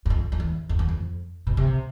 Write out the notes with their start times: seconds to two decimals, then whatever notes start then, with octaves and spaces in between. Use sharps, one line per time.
0.06 E2
0.10 F2
0.32 F2
0.40 E2
0.69 F2
0.79 E2
0.89 F2
1.47 B2
1.57 C3